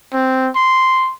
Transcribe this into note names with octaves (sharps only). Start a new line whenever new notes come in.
C4
C6